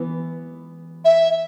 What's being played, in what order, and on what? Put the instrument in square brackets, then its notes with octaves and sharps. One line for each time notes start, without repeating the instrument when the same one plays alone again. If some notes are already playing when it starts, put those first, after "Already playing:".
Already playing: [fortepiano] E3 B3
[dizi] E5